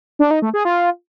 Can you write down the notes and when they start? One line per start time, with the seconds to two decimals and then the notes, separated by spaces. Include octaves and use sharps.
0.19 D4
0.31 D#4
0.42 A3
0.54 G#4
0.65 F4